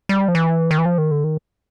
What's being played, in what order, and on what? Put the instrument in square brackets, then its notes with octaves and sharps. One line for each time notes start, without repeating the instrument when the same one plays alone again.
[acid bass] G3
F3
E3
D#3
E3
F3
D#3
D3
D#3